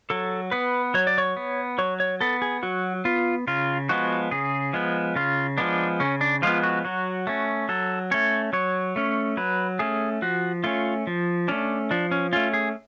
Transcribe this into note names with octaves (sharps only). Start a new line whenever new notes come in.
F#3 A4
B3 B4
F#3 C#5
D5
C#5
B3
F#3 C#5
C#5
B3 A4
G#4
F#3 F#4
B3 F4
C#3 F4
F3 G#3 B3 F#4
C#3 G#4
F3 G#3 B3
C#3 F4
F3 G#3 B3 D4
C#3 C#4
D4
F3 G#3 B3 F4
F#4
F#3 F#4
A3 C#4
F#3 A4
A3 C#4 C#5
F#3 C#5
A3 C#4
F#3 B4
A3 C#4 G#4
F3 F#4
A3 C#4 F4
F3
A3 C#4 D4
F3 D4
C#4
A3 C#4 F4
G#4